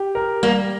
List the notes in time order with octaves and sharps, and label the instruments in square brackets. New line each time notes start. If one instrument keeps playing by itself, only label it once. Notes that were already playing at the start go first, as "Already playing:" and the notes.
Already playing: [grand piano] G4
A#4
[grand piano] G3 [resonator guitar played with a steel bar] A#3